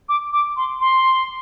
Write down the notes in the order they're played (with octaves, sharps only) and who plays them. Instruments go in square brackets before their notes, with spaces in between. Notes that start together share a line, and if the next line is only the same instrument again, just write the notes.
[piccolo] D6
D6
C6
C6